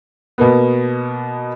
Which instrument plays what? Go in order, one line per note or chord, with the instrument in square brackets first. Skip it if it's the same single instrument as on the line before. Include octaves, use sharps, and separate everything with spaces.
[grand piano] B2 A#3 B3